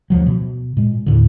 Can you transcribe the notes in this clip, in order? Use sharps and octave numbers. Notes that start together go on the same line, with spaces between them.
D2 F3 F#3
B2
A#2 G#3
D#2 A2 D3